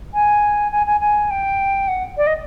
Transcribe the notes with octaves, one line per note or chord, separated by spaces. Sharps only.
G#5
G#5
G#5
G#5
G5
F#5
D5
D#5